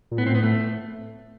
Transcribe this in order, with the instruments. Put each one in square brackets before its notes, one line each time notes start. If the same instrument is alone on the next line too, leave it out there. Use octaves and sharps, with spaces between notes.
[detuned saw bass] A#2
[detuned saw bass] A2 [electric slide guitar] B3
[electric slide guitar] C4
B3
A3